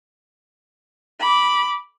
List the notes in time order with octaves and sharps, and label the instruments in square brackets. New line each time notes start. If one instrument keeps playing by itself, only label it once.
[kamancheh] B5 D6